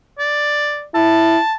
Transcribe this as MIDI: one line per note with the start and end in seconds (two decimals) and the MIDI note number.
0.19 0.85 74
0.95 1.39 64
0.95 1.54 81